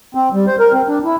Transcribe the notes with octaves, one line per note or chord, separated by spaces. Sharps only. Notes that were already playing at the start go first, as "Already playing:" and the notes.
C4
G3
C5
A#4
C4
D4
E4